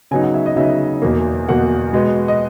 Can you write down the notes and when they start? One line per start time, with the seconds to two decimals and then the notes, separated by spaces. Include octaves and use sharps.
0.11 C#3 F#3 B3 D#4 G#5
0.23 F#5
0.34 E5
0.46 D#5
0.56 C#3 F#3 B3 D#4 E5
1.02 E2 B2 A#3
1.48 E2 B2 A#3 F#5
1.93 B2 G#3 B3
2.28 D#5